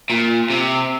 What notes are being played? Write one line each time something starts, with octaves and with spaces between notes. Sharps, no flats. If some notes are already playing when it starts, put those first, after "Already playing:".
A#2
C3